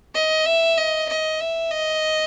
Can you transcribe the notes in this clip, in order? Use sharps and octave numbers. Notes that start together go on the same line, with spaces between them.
D#5
E5
D#5
D#5
E5
D#5